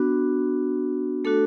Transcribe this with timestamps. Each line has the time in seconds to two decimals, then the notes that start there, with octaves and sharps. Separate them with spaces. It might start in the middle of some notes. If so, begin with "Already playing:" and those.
Already playing: B3 D4 F#4
1.24 A3 D4 F#4 A4